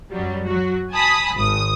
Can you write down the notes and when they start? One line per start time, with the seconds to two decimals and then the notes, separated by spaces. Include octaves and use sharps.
0.11 F#2 F#3 G3
0.46 F#3 F#4
0.91 G#5 A5 B5 D#6
1.34 G#1 D#6